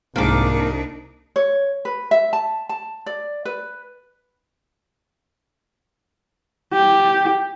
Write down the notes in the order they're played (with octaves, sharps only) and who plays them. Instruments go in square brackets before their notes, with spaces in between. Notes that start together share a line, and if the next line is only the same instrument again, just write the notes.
[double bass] C2 [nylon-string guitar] G#2 F3 [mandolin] A#3 D6 [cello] D4 D#4
[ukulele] C#5
B4
E5
A5
A5
D5
B4
[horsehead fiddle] G4